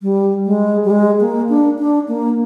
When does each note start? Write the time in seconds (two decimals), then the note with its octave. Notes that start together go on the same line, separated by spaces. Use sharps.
0.02 G3
0.46 G#3
0.85 G3
0.90 G#3
1.21 A#3
1.49 D4
1.79 D4
2.08 A#3